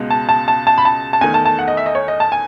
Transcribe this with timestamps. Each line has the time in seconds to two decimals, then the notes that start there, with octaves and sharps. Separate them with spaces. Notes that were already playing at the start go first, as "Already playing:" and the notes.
Already playing: C#2 B2 G#3
0.10 A5
0.29 A5
0.48 A5
0.67 A5
0.78 B5
0.85 A5
1.13 A5
1.21 E2 D#3 A3 G#5
1.34 A5
1.45 A5
1.59 F#5
1.68 D#5
1.77 E5
1.86 D#5
1.95 C#5
2.08 D#5
2.20 A5
2.32 G#5